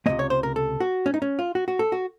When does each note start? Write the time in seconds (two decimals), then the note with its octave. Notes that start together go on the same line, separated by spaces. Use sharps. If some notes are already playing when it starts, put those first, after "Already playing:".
0.06 C#2 C3 D#3 A#3 D#5
0.19 C#5
0.30 C5
0.43 A#4
0.56 A4
0.80 F#4
1.06 C#4
1.14 D#4
1.22 C#4
1.39 F4
1.55 F#4
1.68 F#4
1.79 A4
1.92 F#4